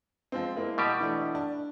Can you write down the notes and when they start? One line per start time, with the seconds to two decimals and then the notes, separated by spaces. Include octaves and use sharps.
0.32 F3 G#3 C4
0.56 G#3 A#3 E4
0.78 B2 G3 G4
1.00 E3 A3 D4
1.35 D4